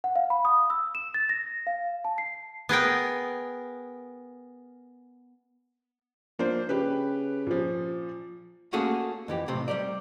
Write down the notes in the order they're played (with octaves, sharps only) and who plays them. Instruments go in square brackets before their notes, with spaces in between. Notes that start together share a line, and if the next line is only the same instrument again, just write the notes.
[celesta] F#5
F5
B5
D#6
E6
E7
A6
A#6
F5
A5
C7
[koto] B3 G#4 A#4 G5
[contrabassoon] F3 [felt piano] A#3 D4 C5
[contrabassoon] C#3 [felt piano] G4 B4
[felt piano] A#2 F3
[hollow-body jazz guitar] A3 A#3 C#4 F#4 G#4 A4
F2 E3 G4
B1 A2 C3 C4
G3 C4 G4 A#4 D5